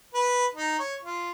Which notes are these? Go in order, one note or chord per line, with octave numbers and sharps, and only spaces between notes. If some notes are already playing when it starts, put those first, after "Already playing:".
B4
D#4
C#5
F4